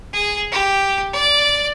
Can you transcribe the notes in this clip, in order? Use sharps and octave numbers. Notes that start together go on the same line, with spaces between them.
G#4
G4
D5